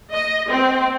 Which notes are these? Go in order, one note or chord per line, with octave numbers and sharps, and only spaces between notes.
D#5
C4